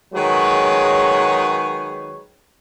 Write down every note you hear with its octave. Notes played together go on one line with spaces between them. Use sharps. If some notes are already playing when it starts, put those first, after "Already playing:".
D#3 F#3 G#3 G#4 B4 C#5